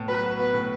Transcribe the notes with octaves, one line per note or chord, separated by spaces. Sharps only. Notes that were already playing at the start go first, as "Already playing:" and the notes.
Already playing: A2 B3
F#3 B4
F#4
B3 B4
A2